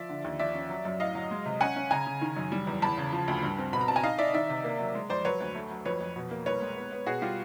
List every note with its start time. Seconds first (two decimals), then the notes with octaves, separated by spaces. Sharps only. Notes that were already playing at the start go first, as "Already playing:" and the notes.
Already playing: F3 D5 E5
0.09 D3
0.24 D#2
0.39 F3 D5 E5
0.55 C#4
0.70 F#3
0.85 F#2
1.00 A2 D#5 F5
1.15 F#3
1.31 G#3
1.46 C3
1.61 C#4 F#5 G#5
1.76 C#4
1.91 C#3 G#5 A#5
2.06 C#3
2.22 D#3
2.37 F#2
2.52 G3
2.67 E2
2.82 E2 A5 B5
2.98 C#3
3.13 F3
3.28 D2
3.43 G2
3.59 C4
3.73 B2 B5
3.81 A#5
3.88 C4 A5
3.96 G#5 A#5
4.03 D#4 D#5 F5
4.18 D#4 D5 E5
4.34 D#3 D5 E5
4.49 C3
4.64 A#3
4.79 F#3
4.95 G#3
5.10 F2 C5 D5
5.25 F#3 B4 C#5
5.40 D2
5.55 A3
5.70 F#3
5.85 F2 B4 C#5
6.01 F2
6.16 B2
6.31 A#3
6.46 C2 B4 C#5
6.61 G#3
6.76 B3
6.92 B3
7.06 B2 F#4 G#4
7.22 G3 F4 G4